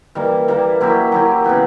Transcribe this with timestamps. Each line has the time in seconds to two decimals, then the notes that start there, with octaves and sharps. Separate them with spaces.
0.15 E3 G3 A#3
0.48 E3 G3 A#3
0.81 F#3 A#3 E4 G4
1.12 F#3 A#3 E4 G4
1.44 C#3 E3 B3 E4